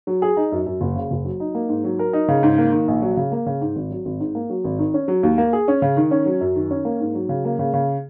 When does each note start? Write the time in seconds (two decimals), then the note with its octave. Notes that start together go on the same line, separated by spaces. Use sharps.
0.07 F#3
0.22 G#4
0.37 D#4
0.52 F#2
0.66 F#2
0.81 F#1
0.96 C#3
1.11 F#1
1.25 F#3
1.40 D#4
1.55 A#3
1.69 G#2
1.84 F#3
1.99 A#4
2.13 D#4
2.28 C#3
2.43 G#2
2.58 A#3
2.72 D#3
2.88 A#1
3.02 F#3
3.17 C#3
3.32 A#3
3.46 C#3
3.61 G#2
3.76 G#1
3.91 F#3
4.05 G#1
4.20 G#2
4.35 A#3
4.50 F#3
4.64 G#1
4.79 D#3
4.94 C#4
5.08 F#3
5.23 D#2
5.38 A#3
5.53 G#4
5.68 C#4
5.82 C#3
5.97 D#3
6.11 C#4
6.26 F#3
6.41 F#2
6.56 D#3
6.71 C#4
6.85 A#3
7.00 G#2
7.15 F#3
7.29 C#3
7.45 A#3
7.59 C#3
7.74 C#3